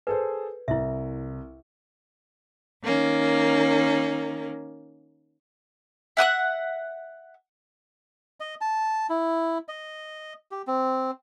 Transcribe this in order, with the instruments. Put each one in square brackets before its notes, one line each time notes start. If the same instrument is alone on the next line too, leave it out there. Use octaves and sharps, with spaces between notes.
[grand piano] G#4 A4 C5 [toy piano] B4
[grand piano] C2 [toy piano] E4 E5
[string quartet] D#3 A#3 C#4
[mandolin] E5 F#5 D#6 F#6
[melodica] D#5
A5
E4
D#5
G4
C4